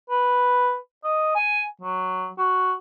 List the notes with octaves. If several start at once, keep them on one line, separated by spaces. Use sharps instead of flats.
B4
D#5
G#5
F#3
F#4